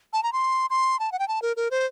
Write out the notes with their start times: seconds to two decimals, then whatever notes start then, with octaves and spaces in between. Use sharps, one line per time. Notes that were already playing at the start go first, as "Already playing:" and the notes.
0.13 A5
0.23 A#5
0.33 C6
0.70 C6
0.99 A5
1.12 F#5
1.19 G5
1.28 A5
1.42 A#4
1.57 A#4
1.71 C5